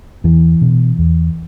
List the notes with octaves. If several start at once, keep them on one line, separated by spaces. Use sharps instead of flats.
E2 E3
B2
E2